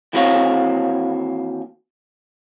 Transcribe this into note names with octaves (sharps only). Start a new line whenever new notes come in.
D#2 E3 C4 F#4 C#5 F5